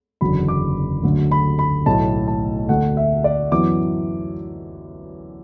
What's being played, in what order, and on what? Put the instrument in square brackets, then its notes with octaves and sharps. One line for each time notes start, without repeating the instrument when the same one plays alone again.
[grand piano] F#1 E2 D3 F#3 B5
D6
D2 D3 F#3 A3
B5
B5
B1 A2 A3 A5
A5
D2 D3 A3 F#5
E5
D5
F#2 E3 B3 D6